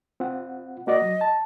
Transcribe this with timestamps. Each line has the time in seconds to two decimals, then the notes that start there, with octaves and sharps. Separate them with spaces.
0.20 C4 F4 F#5
0.87 A#3 F#4 D5 D#5
1.02 F#3
1.21 A5